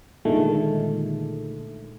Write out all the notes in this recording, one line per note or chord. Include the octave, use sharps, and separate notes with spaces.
A#2 D3 D#3 G#3 A3